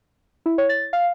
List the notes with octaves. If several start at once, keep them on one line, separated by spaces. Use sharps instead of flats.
E4
C#5
A6
F5